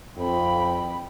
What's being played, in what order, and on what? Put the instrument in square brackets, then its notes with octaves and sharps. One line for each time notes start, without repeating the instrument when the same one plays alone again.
[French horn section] F2 [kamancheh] G5 B5